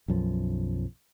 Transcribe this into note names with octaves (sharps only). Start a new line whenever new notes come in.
B1 F#2 F3